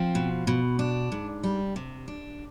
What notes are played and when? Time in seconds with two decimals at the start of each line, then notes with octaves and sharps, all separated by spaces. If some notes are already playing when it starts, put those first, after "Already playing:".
Already playing: F3 C4
0.15 B2
0.47 B2
0.79 D4
1.12 G#2
1.43 G3
1.76 C3
2.08 D4